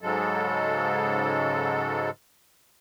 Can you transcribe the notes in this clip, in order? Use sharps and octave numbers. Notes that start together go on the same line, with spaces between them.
G#2 C#3 F#3 G#3 A4